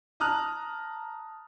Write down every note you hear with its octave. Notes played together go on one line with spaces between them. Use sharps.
A5 A#5 D#6 F6 F#6